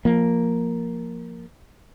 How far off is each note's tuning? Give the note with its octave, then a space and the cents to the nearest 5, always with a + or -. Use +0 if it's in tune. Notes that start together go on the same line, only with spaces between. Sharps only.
F3 +0 A#3 +0